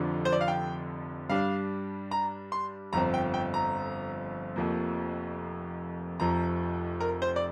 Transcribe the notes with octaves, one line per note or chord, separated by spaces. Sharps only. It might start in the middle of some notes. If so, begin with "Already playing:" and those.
Already playing: F1 F2 D3 F3 D4
C5
D5
F5
G5
G2 G3 D4 F5
A#5
C6
G1 F2 F3 C4 A#5
G5
G5
A#5
F1 F2 F3 A#3
F1 F2 F3 A#5
A#4
C5
D5